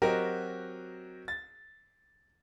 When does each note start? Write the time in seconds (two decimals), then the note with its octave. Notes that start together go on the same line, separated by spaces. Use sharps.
0.02 F#3 C4 F#4 G4 A#4 D#5
1.28 A6